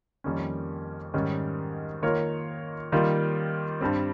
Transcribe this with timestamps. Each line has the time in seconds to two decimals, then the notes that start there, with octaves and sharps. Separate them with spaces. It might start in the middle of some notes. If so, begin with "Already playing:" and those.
0.24 F2 D#3 G3 A#3 C#4
1.14 G#2 D#3 G3 C#4
2.02 D#3 A#3 F4 A#4 C#5
2.92 D#3 G3 A#3 F4
3.81 G2 G3 C4